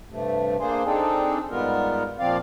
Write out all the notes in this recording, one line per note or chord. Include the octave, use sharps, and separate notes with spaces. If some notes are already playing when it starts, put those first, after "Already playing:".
G2 C3 A3
A#3 D4 G#4 C5
C4 D4 D#4 G#4 A4
G#2 G3 B3 F4 A#4
A#2 F3 C4 D5 F5